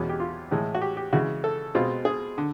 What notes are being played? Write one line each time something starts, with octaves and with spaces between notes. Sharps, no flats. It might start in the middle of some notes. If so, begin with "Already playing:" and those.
Already playing: E2 B2 G#3 C#4
G4
F4
A2 E3 G#3
F#4
G4
G4
C#3 E3 G#3 F#4
A4
B2 G#3 C4 F4
G#4
D3